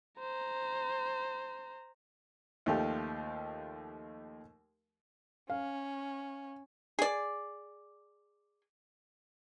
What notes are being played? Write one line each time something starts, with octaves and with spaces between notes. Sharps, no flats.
C5 A#5
D#2 F3 A3 G4 F5
C#4 F5
G#4 D5